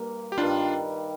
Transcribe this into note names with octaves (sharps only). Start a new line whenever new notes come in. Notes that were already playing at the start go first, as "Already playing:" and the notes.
Already playing: G2 A#3
G4
G2 D#3 G3 D4 F4